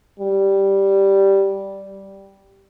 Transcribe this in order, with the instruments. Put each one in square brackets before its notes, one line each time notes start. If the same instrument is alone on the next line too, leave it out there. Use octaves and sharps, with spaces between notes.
[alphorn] G3